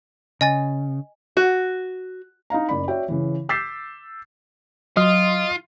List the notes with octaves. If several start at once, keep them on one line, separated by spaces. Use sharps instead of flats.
C#3 D#5 G#5 A6
F#4
D#4 D#5 F5 A#5
F#1 D5 B5
F#4 C#5 D5 E5 G5
C#3 E3
D6 E6 G6 A6 B6 C7
F#3 F4 D#5 C6 D#6 F6